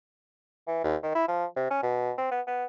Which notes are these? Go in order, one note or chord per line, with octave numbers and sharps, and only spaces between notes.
E3
D#2
D#3
E4
F3
C3
C#4
B2
C4
B3
B3